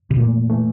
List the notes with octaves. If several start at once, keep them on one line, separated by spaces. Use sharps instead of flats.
C3
F2 A#2 E3 A3
E3 A3